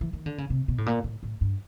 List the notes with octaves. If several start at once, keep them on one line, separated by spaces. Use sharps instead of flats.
E3
D#3
D3
C#3
C3
B2
A2
A#2
A2
A2
G2